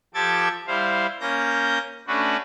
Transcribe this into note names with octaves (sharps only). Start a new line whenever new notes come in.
F3 G4 A4 D6 G#6 A6
G3 E4 C5 F5
A#3 C#4 G6 A#6
A3 C#4 D4 F#4 B4